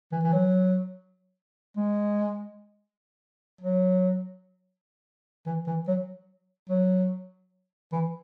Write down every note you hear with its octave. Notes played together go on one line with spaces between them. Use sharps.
E3
E3
F#3
G#3
F#3
E3
E3
F#3
F#3
E3